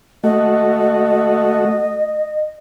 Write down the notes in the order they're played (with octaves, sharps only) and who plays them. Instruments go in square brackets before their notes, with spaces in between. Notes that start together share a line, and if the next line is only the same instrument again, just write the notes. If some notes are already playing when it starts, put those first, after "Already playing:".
[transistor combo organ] A3 F#4 [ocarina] D#5